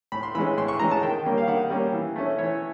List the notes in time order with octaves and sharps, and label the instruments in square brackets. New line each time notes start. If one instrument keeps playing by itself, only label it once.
[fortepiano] A2 B5
C6
E3 G#3 C#4 B5
A2 C6
C#6
E3 G#3 C#4 A#5
A5
D#3 G5
G3 A#3 C#4
F5
D#3 F#5
G3 A#3 C#4
E3
A3 C#4
E3 C#5